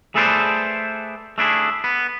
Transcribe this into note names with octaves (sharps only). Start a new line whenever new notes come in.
A3 G#4 A4 B4 C5 D5
A3 D4 E4 G#4
B3